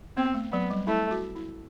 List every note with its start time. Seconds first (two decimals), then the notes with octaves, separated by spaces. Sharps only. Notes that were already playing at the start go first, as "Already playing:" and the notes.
0.17 B3 C4
0.34 A3
0.52 F#3 B3
0.70 G3
0.87 A3 E4
1.11 F#4
1.35 E4